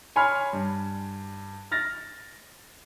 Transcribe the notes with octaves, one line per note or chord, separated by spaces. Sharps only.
C#5 G#5 B5 C6 F6
G2
F6 A6 A#6